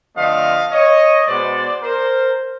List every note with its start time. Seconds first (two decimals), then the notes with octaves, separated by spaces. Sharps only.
0.16 D3 F3 A3 C4 D#5 F5
0.72 C#5 D#5
1.27 B2 G#3 B3 C5 D5
1.82 A#4 C5